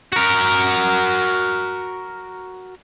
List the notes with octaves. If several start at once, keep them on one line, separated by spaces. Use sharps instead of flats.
F#4 A#4